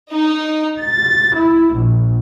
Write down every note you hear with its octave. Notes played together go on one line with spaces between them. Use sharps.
D#4
A6
E4
A#1